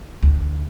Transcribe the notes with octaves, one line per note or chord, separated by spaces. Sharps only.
D2